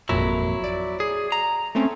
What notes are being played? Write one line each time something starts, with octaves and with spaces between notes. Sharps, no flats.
G#1 F2 A#2 F#3 E4
D5
G#4
A#5
A3 C4 C#4